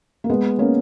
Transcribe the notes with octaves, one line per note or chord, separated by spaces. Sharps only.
A#3
G#3 B3
A#3 C#4